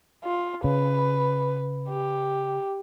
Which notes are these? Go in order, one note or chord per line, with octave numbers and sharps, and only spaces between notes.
F4
C#3 B4
G4